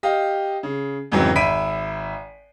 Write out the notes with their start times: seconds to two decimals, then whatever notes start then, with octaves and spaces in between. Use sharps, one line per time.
0.03 G4 D#5 F5
0.63 C#3
1.12 F2 G#2 C#3 E3 F#3
1.36 G#1 E5 B5 B6 D7 D#7